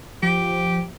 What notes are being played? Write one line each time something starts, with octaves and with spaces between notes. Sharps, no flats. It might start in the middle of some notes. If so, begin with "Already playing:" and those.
F3 G4